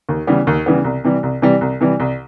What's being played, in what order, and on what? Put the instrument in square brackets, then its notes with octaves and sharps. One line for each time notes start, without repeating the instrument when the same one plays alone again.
[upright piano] D#2
C#3 E3 G3 B3
D#2
C#3 E3 G3 B3
C2
C3 E3 G3
C2
C3 E3 G3
C2
C3 E3 G3
C2